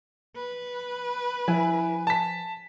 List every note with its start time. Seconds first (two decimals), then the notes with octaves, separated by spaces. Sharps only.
0.36 B4
1.48 F3 E4 G#5
2.07 A5 B6